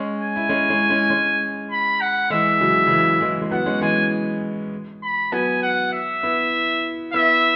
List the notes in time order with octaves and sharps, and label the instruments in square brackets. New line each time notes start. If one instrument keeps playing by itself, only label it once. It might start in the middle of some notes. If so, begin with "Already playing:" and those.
Already playing: [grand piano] G#3 C#4
[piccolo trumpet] G#5
[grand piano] E4
G#3 C#4
G#3 C#4
G#3 C#4
G#3 C#4
[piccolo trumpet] B5
F#5
[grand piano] E3 G#3 [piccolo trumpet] E5
[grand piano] C#3 F#3
C#3
E3
E3 G#3
G#3
[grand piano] F#3 B3 [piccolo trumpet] F#5
[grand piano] G#3 C#4
[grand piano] E3 G#3 [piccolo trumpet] G#5
[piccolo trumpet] B5
[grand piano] F#3 B3 [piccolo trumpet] G#5
[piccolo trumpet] F#5
E5
[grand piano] B3 E4
[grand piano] B3 E4 [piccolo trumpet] E5